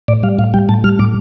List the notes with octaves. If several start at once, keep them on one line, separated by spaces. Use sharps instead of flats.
A2 D5
G3 F5
A2 F5
G3 G5
A2 A5
G3 F6
A2 D6